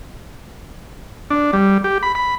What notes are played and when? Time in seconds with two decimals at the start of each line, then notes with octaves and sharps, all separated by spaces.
1.30 D4
1.53 G3
1.84 G4
2.03 B5
2.15 B5